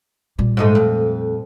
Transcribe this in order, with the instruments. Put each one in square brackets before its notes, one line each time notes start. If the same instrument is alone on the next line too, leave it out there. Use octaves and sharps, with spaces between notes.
[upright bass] A#2 G3
[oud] G#2 G#3 A3
F2